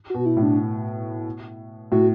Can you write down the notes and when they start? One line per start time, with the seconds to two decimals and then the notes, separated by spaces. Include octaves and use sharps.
0.10 B2 F#4
0.26 E4
0.37 A2
0.42 D4
1.92 A2 F#4